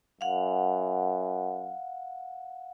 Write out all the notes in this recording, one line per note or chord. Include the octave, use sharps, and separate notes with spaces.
F#2 F5 F#5